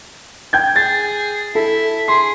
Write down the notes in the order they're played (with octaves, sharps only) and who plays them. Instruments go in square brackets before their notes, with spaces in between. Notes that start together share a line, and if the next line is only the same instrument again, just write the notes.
[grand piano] G5 G6 G#6
[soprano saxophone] G#4 [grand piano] A6
[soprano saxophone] E4 [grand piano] A4
[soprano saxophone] G#4 [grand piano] C6